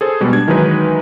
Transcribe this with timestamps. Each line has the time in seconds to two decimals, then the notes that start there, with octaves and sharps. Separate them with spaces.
0.01 G#4 A4 C5
0.21 B2 G3 G#3
0.33 D4 G#6
0.48 D#3 E3 F#3 G#3 D#4 B4